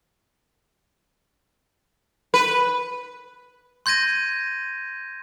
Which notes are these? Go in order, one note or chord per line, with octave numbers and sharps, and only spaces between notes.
B4
C6 G6 G#6 A#6 D#7